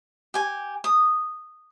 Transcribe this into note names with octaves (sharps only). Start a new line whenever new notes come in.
G4 G#5
D#6